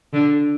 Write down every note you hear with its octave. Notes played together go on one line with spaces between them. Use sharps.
D3